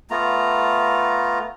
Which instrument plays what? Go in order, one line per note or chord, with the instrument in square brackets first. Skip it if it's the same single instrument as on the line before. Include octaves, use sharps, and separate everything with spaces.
[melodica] A3 B3 F4 A#5